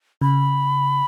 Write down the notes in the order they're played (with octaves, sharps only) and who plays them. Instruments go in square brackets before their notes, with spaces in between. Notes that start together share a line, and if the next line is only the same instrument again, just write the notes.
[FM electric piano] C#3 [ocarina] B5